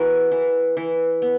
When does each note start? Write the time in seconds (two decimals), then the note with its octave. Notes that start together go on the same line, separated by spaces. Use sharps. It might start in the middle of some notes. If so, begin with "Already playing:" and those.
Already playing: E3 B3 F#4 G#4 A#4
0.32 E3
0.77 E3
1.22 B3